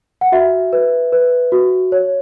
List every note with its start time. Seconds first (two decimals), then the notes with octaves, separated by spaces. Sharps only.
0.21 F#5
0.32 F#4 E5
0.73 B4
1.12 B4
1.52 F#4
1.92 C#5